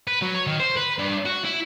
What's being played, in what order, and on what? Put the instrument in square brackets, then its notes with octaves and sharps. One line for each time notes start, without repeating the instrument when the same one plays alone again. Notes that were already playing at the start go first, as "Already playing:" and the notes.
[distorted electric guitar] B4
F#3
C#5
D#3
C5
B4
G2
F#4
E4